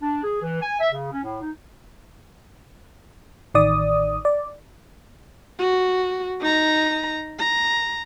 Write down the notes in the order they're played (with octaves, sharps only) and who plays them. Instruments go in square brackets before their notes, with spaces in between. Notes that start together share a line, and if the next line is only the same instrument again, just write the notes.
[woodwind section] D4
G#4
E3
G#5
E5
C#3
C#4
A2
D#4
[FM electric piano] A1 D#3 D5 D#6
D5
[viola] F#4
D#4 A#5
A#5